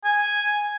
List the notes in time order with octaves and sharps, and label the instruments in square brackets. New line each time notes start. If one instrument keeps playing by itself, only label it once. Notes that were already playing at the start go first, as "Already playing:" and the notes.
[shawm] G#5